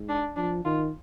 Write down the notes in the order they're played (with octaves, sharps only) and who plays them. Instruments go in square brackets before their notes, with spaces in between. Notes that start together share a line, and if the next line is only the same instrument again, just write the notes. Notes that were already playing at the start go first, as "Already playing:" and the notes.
Already playing: [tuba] G#2
[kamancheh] D4
[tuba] F3 [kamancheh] D4
[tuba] D#3 [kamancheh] F4